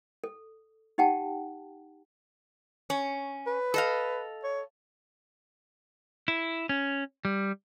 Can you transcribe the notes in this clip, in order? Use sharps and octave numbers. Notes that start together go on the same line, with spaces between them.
A4
D#4 G4 F#5 G5 A5
C#4
B4
A4 D#5 F5
C#5
E4
C#4
G3